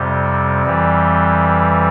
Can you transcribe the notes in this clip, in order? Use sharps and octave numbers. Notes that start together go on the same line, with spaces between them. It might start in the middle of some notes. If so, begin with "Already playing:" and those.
Already playing: F2 C3 G3
F2 E3 G3